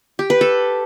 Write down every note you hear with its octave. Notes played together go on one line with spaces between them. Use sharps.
G4
B4
A4